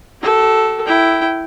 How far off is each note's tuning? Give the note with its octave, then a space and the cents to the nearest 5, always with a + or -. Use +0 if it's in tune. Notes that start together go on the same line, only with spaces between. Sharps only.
F#4 +45 A4 -5
E4 +0 G5 -15